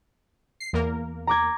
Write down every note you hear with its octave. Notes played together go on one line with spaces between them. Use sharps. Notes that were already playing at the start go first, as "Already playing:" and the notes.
C7
E2 A#3 A#4
A#5 D6 G#6